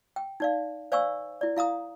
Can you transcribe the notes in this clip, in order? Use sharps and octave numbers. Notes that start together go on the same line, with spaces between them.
G5
D#4 D5 F5
C5 D5 F5 G#5 C#6 E6
E4 D5
E4 F5 A#5 D#6